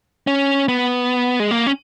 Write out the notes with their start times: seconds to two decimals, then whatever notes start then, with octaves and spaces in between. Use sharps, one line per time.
0.27 C#4
0.68 B3
1.40 G#3
1.51 A#3
1.66 C#4